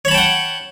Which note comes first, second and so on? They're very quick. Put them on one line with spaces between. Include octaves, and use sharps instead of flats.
C#5 B5 A5 G5 F#5